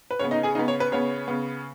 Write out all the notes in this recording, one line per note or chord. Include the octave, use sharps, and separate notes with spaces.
B4
C#3 B3 C#5
D#4 D#5
G#4 G#5
C#3 B3 D#4 D#5
C#5
B4
C#3 B3 C#5
C#3 B3